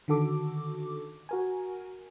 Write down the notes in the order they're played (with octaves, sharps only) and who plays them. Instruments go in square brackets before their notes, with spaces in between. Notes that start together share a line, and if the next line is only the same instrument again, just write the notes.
[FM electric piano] D3 D#3 F#4 A4 D6
F#4 A#4 G#5